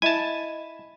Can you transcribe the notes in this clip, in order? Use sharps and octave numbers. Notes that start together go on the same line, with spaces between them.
E4 D#5 G#5 A5